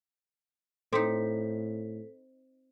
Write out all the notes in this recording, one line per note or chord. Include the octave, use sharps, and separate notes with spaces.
A2 C4 D#4 A4 B6